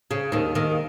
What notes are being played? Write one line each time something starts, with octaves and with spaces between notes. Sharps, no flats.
C#3
D#2 D#3
D#2 D#3